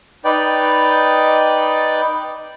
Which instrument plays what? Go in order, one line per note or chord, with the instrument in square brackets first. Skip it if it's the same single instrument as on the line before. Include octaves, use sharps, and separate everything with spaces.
[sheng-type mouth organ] D#4 B4 D5 G5